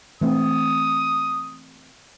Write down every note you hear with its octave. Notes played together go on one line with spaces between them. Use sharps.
E3 A3 C4 D#6